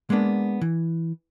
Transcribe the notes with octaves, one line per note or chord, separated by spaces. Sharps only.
G#3 A#3 B3 D4
E3